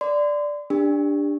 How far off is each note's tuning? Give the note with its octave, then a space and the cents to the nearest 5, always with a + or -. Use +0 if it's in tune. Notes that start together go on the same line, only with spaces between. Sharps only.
D5 +0 C6 -35
D4 +0 G4 +30